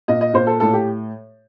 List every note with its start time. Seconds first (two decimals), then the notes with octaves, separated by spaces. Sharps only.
0.08 A#2 D#5
0.21 D#5
0.34 A#2 C5
0.47 A4
0.60 A2 A4
0.73 G4